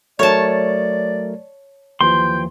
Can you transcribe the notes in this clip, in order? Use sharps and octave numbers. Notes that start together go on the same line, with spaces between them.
F#3 A3 A#4 C#5 D5 A5
D#2 E3 F3 G5 C6